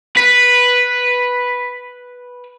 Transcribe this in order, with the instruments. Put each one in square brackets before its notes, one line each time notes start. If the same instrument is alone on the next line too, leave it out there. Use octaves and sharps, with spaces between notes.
[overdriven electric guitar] B4 [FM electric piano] B6